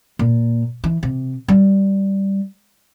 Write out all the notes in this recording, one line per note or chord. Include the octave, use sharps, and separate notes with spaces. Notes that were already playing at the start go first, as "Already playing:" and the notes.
A#2
E3
C3
G3